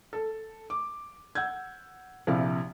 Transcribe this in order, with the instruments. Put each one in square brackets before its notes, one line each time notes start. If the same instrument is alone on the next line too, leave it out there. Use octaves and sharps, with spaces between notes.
[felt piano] A4
D6
F#5 E6 G6 G#6
A#1 C3 E4 F5